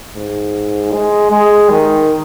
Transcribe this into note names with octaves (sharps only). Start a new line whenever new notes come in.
G#2
G#3
G#3
D#3